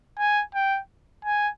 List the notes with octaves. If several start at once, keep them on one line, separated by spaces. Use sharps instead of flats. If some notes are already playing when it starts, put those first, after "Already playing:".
G#5
G5
G#5